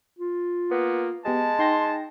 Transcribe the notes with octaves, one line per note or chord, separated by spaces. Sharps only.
F4
A#3 B3
G#3 B3 G4 G#5 A5
D#4 G5 C6 A#6